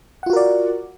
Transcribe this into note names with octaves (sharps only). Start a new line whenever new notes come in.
F4 F#4 A#4 D5 F#5